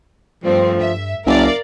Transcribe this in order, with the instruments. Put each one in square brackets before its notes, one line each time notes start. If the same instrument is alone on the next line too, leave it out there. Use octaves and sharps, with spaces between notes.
[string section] G2 A3 C4 [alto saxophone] F3
[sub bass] G2 [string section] E5
[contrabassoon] F#1 [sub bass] C2 [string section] A#4 D5 F5 [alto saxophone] E5